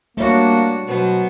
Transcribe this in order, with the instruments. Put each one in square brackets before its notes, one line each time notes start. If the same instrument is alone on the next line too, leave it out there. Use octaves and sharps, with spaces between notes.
[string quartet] G3 D4 F#4 [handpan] A3 C#5 [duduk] A#3
[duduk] B2 [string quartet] F#3 B3 C5